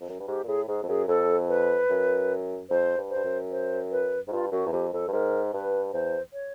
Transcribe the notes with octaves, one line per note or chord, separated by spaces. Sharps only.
F2
F#2
G2
G#2 G4
A#2
A2 G#4
G#2 G#4
F2
F#2 G#4
F2 A4
B4
F#2
F2 C5
G2
C5
G2
F#2
C5
B4
G#2
G2 F4
F#2 F#4
E2
F2 G4
F2 A4
G2
G#2 A#4
G2 B4
E2 C5
C#5